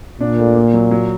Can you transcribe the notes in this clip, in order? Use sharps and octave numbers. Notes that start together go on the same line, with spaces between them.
A#2 D4
A3
A#3
F#3
F#3